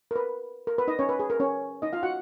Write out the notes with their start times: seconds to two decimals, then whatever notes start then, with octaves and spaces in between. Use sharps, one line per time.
0.11 A#4
0.16 B4
0.67 A#4
0.78 B4
0.88 D#4 D#5
0.99 C#4 C#5
1.09 B4
1.19 G#4
1.30 A#4
1.40 C#4 C#5
1.82 D#4 D#5
1.93 F4 F5
2.03 F#4 F#5